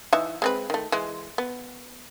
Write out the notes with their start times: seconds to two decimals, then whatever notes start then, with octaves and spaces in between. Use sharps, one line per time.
0.13 E3 D#4 E5
0.42 G#3 C4 B4
0.70 D#3 A3
0.92 E3 G#3
1.38 B3